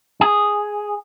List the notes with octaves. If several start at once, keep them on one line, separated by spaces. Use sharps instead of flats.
G#4